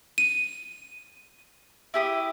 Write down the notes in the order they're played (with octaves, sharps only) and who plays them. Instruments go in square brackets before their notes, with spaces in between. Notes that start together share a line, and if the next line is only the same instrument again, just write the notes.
[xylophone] D#7
[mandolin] E4 G4 D#6